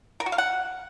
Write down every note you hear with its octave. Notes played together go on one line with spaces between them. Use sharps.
A#4
F#4
F5
F#5